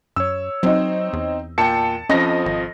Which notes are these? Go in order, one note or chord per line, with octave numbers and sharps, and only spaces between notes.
F#2 C#5 E6
F#3 C4 D#4
E2
A#2 G5 A5 C#7
F2 F3 C#4 D#5 A#6
G#1